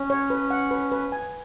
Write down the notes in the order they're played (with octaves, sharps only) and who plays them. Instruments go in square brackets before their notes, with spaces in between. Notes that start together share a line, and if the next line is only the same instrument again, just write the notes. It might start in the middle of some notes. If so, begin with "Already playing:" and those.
Already playing: [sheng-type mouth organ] C#4
[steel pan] C#5
B4
F#5
B4
B4
G#5